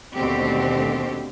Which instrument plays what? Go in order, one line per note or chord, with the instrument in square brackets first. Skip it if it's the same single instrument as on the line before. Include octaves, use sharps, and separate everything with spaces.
[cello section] D#2 B2 D3 A3 C4 G4